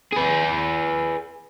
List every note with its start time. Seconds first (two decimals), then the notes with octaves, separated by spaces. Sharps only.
0.13 G#4 B4